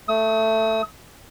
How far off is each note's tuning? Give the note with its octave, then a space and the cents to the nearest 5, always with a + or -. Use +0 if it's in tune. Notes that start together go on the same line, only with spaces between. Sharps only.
A3 +10 D#6 +40